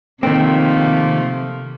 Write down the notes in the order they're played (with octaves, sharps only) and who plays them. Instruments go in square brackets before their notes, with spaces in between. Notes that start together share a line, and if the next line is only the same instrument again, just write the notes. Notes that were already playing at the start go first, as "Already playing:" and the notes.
[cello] C3 [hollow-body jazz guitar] D#3 C4 [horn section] F3 A3 A#3